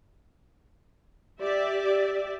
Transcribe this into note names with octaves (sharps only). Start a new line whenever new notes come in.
G4 D5 E5